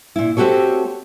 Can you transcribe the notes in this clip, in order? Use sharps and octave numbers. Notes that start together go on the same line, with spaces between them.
A#2 E4
A3 C4 F#4 G4 A4 C#5